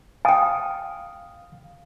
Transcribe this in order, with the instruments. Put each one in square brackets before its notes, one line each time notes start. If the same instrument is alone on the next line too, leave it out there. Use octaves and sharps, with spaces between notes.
[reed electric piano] F5 D#6 [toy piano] G5 G#5